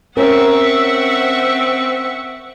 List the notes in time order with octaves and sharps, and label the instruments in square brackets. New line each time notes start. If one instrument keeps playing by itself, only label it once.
[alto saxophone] C4 [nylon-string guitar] C#4 [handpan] A#4 [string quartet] E5 F#5 C#6